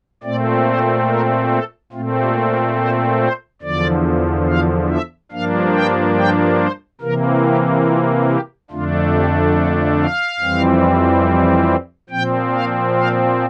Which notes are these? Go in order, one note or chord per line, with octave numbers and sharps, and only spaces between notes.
A#2 A3 C4 D5
C5
A#4
A4
A#2 A3 C4 F4
G4
A#4
C5
C5
E2 D3 F3 D5
F5
E5
G2 F3 A#3 D4 F5
G5
G5
C5
C3 E3 A#3 A#4
G4
F4
G4
F2 D3 A3 D4 F4
G4
A4
F5
F2 E3 G3 C4
A#2 F3 C4 G5
F5
F5